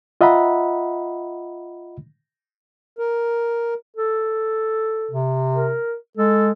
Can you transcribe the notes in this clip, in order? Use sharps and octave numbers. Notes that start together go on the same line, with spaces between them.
F4 D#5 E5 F#5 A#5 B5
A#4
A4
C3
A#4
G#3 A4